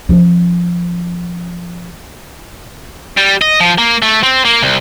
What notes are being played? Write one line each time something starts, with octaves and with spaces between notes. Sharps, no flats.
F3 C#4
G3
D#5
F3
A#3
A3
C4
A#3
C2